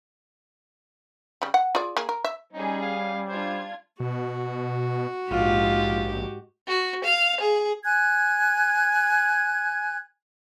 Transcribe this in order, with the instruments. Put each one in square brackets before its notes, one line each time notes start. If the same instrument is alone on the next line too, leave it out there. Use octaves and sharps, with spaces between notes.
[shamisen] C#3 G3
F#5
F4 G#4 D5
A#3 G#4
A#4
E5
[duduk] G3 [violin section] C#4 G#4 [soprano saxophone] D#4
[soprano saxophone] F5
[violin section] D4 F4 G#6 [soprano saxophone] C5
[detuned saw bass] B2 [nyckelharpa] F#4
[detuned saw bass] A#1 [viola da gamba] G#2 G4 [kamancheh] F4
[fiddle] F#4
F5
G#4
[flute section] G#5 F#6 G#6